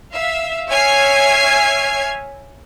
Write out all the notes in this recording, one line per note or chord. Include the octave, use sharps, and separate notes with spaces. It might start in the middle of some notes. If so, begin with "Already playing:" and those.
E5 F5
C#5 E5 G#5 F6 G#6 C7